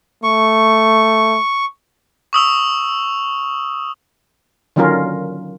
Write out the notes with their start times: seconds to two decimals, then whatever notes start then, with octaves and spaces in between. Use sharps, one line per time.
0.24 A3 C#6
2.33 C#6 D#6 E6 F7
4.76 D3 D#3 F#3 C#4 F4 A#4